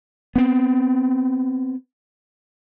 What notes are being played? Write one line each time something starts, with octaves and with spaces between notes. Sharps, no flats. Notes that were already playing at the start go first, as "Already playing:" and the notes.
B3 C4